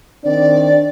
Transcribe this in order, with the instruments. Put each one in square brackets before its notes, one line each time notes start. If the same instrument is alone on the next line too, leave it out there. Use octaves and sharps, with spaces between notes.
[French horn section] D#3 C4 D4 [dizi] D5